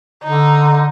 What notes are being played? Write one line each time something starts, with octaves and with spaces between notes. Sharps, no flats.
D3 D#4